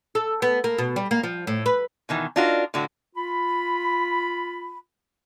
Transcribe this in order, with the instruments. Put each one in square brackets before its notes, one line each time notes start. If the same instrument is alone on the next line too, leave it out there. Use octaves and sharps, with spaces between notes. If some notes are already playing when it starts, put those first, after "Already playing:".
[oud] A4
B3
A#3
B2
G3
A#3
F3
A2
B4
[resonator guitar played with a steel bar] B2 D#3 E3
D4 D#4 F4 F#4 A#4
A2 D3 F#4
[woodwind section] F4 B5